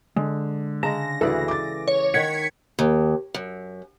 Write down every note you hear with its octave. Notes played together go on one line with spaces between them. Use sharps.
D3 G#3
C#3 G#3 A5 A#5 A#6
D2 E3 G#4 A4 B4 D5 F#5
D6 A6
C#5
D#3 F#5 G#6 B6 C#7
D#2
F#2